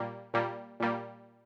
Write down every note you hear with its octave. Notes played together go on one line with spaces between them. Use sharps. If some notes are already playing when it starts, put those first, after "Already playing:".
Already playing: A#2 G3 A#3
A#2 G3 A#3
A#2 G3 A#3